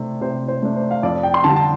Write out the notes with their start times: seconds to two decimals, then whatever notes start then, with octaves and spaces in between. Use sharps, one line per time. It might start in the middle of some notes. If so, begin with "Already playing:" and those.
Already playing: C3 A3 D4
0.21 C3 C5
0.48 C5
0.62 A3 D4
0.76 C5
0.91 F5
1.03 F2 D5
1.23 G5
1.34 C6
1.44 D3 G3 A5
1.56 A5